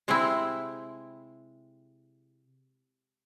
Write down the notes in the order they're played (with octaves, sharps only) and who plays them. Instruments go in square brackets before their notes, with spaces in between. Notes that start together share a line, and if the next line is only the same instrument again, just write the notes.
[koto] C3 G#3 C4 E4